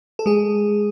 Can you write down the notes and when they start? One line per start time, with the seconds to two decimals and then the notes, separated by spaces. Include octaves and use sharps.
0.19 A4
0.26 G#3 G#4